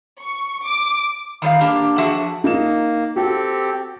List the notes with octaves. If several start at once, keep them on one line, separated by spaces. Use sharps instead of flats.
C#6
D6
D#3 G3 D5 F5
A#3 D4 G4
F2 F3 D4 F#4 G#4 E5
A#3 D#4 E7
C4 F#4 G4 A4